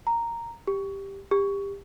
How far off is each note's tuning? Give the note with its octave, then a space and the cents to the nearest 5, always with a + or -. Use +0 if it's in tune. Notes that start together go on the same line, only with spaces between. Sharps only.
A#5 -5
G4 +5
G4 +25